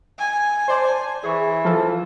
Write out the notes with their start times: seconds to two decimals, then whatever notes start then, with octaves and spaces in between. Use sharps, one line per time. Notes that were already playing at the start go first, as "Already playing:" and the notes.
0.19 G#5
0.68 C5 D5 A5
1.23 E3 G#4 C#6
1.65 F3 F4 A4